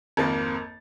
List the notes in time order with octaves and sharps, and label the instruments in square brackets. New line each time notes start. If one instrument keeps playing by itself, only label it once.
[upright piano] G#1 F2 A#3 A6